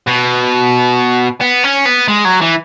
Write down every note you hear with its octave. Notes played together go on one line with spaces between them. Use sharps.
B2
B3
C#4
B3
G#3
F#3
E3